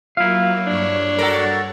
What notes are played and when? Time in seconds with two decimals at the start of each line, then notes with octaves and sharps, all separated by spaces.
0.17 F#3 A#3 E4 F4 F5
0.67 G2 D4 C#5
1.18 F#4 A4 A#4